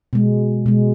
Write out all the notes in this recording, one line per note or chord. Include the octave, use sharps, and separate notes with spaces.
B2 G#3
B2 G#3